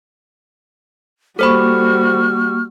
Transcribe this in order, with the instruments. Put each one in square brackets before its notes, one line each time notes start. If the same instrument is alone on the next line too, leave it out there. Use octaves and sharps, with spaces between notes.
[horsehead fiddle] G3 F#4 [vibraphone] A#3 C#6 [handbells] A4 C5 B5 [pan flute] F6